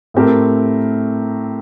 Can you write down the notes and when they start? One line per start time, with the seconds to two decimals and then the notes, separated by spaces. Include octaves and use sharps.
0.14 A2 A3 C4 G4 A#4